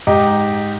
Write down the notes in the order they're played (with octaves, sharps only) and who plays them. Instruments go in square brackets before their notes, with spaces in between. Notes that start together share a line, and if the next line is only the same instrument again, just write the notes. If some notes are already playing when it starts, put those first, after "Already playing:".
[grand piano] G#2 D#4 G4